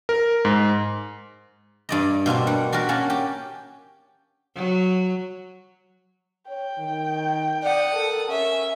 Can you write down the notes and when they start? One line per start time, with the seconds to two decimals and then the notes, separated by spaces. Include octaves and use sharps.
0.09 A#4
0.45 G#2
1.89 G2 D5 D#5
2.26 B2 A#3 C4 D4
2.47 G3 F#5
2.72 D4 F#4 G4 A#4 B4
2.89 A#3 C#4 F#5 A5
3.10 G4
4.56 F#3
6.49 C#5 G5
6.79 D#3
7.63 D5 F#5 D#6
7.95 A4 A#4
8.30 C#4 E5